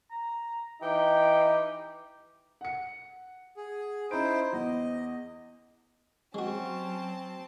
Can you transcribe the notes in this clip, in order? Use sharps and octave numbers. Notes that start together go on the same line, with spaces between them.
A#5
E3 D#4 G4 G5
F#5 C#7
G#4
C#4 D#4 E4 C5 D7
E2 D#5
F#3 G#3 C4 C#4 F#4 A5